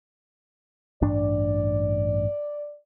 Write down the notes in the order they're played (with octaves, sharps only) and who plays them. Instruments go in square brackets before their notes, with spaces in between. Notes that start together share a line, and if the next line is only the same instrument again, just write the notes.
[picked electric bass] A1 G2 D4 [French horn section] D5